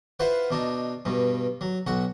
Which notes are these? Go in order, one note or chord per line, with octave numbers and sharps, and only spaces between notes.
E4 F4 B4 C5 F#5
B2 D4 D#4
G2 B2
F#3
B1 F#4 F#5